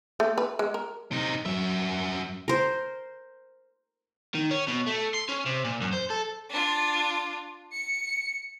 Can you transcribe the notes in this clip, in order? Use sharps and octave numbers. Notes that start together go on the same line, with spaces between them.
A3
B4
G#3
A#4
C3 D#4
F#2 F#3 E5
A#4 C5
D#3
C#4
B2
A3
C6
C#4
C3
A#2
F#2
C5
A4
D4 F4
C#7